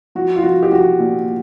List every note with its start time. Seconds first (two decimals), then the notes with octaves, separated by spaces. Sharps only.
0.15 F3 F#4
0.36 F4
0.43 F3 F#4
0.63 G4
0.72 F3 F#4
0.99 A#2